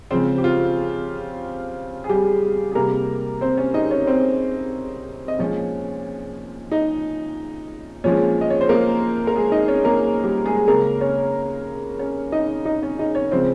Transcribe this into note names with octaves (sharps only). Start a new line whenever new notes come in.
C#3 F3 G#3 C4 C5
G4
F4
G#4
G3 G4
G#4
C3 G3 A#3 A#4
C4 C5
C#4 C#5
D#4 D#5
C#4 C#5
C4 C5
D#5
A#2 F3 G#3 C#4 C#5
D#4 D#5
A#2 F3 G#3 C#4 C#5
D#5
C#5
C5
A#3 A#4
A#4
G#3 G#4
D#4 D#5
C#4 C#5
A#3 A#4
G3 G4
G#3 G#4
C#3 G#3 A#3 A#4
C#4 C#5
C#4 C#5
D#4 D#5
D#4 D#5
C#4 C#5
D#4 D#5
C#4 C#5
C#3 F3 G#3 C4 C5